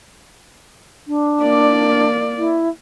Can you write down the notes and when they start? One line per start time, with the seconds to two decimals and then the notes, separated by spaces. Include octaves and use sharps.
1.07 D4
1.42 A#3 D5
2.38 E4